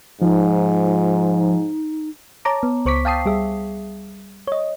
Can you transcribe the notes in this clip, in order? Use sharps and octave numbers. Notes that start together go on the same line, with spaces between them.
G#2 F3 D#4
C#5 A5 A#5 D6
B3
C#2 C5 C#6 D6 B6
F5 G5 A5 D#6 C7
G3 G#4 E5
C#5 D#5